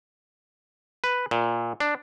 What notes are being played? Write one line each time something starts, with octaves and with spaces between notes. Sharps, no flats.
B4
A#2
D4